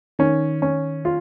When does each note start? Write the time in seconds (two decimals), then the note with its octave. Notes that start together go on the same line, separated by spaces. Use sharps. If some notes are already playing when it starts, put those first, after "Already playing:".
0.19 D#3 C#4
0.62 C#4
1.05 F4